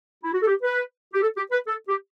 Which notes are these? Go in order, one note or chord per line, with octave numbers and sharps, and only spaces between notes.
E4
F#4
A4
G4
B4
G4
A4
G4
B4
A4
G4